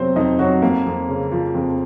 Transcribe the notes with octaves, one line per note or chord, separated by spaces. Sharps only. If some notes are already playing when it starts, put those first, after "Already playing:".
Already playing: F2 C3 F#3 A#3 C4 C5
F2 D#4 D#5
F2 F#3 F#4
F2 A#3
F2
C#3
F3
F2